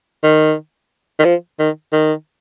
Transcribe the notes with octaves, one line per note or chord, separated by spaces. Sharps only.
D#3
D#3
F3
D#3
D#3